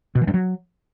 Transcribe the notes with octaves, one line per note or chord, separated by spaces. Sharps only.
B2
E3
G2
F#3